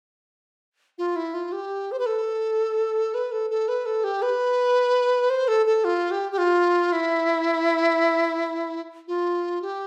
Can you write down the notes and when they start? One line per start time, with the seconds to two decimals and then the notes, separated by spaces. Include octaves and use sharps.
0.98 F4
1.16 E4
1.34 F4
1.52 G4
1.92 C5
1.99 B4
2.06 A4
3.14 B4
3.32 A4
3.50 A4
3.68 B4
3.86 A4
4.04 G4
4.22 B4
5.30 C5
5.48 A4
5.66 A4
5.84 F4
6.11 G4
6.32 G4
6.38 F4
6.92 E4
9.08 F4
9.62 G4